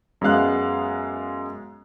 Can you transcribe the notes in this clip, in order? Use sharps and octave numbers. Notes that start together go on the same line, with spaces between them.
F#2 G#3 B3 F5 F#6